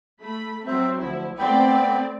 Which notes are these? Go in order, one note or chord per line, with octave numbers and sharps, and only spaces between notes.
A3 B5
F#3 C4 C5 E5
D2 F3 E4
A3 B3 C4 D5 G5 B5